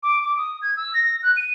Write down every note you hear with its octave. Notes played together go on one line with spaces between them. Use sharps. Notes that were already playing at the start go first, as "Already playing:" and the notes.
D6
D6
D#6
G#6
E6
A#6
F#6
D#7